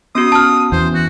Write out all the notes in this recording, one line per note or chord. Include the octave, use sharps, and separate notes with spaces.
B3 C#4 F#4 D#6
A5 F6
E2 C5
F#4